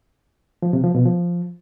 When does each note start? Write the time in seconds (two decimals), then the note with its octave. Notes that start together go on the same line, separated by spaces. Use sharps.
0.62 F3
0.73 C3
0.84 F3
0.95 B2
1.05 F3